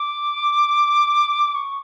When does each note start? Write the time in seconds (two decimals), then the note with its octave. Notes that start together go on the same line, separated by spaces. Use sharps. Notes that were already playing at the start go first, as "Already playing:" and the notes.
Already playing: D6
1.55 C#6